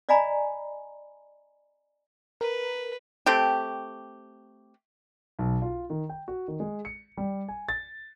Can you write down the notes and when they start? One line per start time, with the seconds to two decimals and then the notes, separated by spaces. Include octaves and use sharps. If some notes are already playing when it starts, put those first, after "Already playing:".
0.09 D5 D#5 F5 G#5 A#5 B5
2.41 A#4 B4
3.26 A3 C4 G4
5.39 B1
5.62 F4
5.90 D#3
6.09 G5
6.28 F#4
6.48 D#3
6.60 G#3
6.85 C#7
7.17 G3
7.48 G#5
7.69 A6